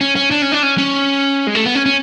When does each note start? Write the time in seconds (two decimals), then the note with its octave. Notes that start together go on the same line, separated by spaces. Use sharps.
0.01 C#4
0.16 C#4
0.31 D4
0.42 C#4
0.52 D4
0.63 C#4
0.78 C#4
1.47 G#3
1.55 A3
1.65 B3
1.75 C#4
1.86 C#4